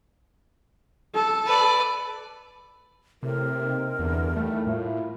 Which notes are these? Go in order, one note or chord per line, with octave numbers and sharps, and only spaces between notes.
A4
B4 D5
A2 C3 A#4
A#3 C4 D#4
E2 G2 D3 E3
D#2 G3 A3 E4
A2 A#3 E4 F4